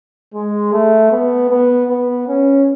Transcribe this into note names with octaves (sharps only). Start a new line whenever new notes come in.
G#3
A3
B3
B3
B3
C#4